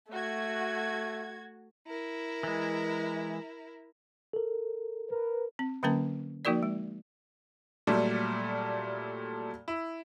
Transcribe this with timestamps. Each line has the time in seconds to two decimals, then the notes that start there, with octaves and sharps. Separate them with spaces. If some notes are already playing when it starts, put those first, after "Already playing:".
0.11 A3 F#4 G#6
1.87 E4 A#4
2.43 E3 G#3
4.33 A4 A#4
5.10 A#4 B4
5.59 C4
5.83 D3 F#3 A#3 C#4 A#4 A5
6.45 F3 A#3 D#4 F#4 A#4 D5
6.63 G#3
7.87 A#2 F#3 G3 A3
9.68 E4